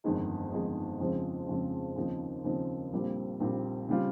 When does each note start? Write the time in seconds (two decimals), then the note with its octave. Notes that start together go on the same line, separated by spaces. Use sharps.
0.04 G1 F2 D#3 G#3 D#4
0.52 G1 F2 D#3 G#3 D#4
1.00 F2 C#3 F3 G#3 C4
1.48 F2 C#3 F3 G#3 C4
1.96 D#2 C#3 F3 C4 D#4
2.44 D#2 C#3 F3 C4 D#4
2.93 A#1 A#2 G3 C4
3.40 A#1 A#2 G3 C4
3.89 C#3 G3 C4 F4